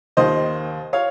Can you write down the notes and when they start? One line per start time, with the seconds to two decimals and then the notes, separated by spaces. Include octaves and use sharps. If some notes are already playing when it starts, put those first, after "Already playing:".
0.17 D#2 D#3 C5 D#5
0.93 C#5 F5